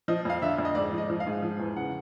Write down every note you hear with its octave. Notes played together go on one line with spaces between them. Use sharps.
F3 D#5
F2 F5
D3 E5
F2
D#5
G#2 D5
F3
D#5
F3
F5
G#2
F3
E2
C#3 F#5